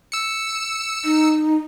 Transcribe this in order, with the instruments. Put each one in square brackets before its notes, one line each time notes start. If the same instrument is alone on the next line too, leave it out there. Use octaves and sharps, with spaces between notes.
[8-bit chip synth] E6 C#7
[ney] D#4